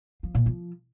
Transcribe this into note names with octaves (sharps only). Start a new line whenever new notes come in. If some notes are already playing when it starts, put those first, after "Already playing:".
F3
A#2
F3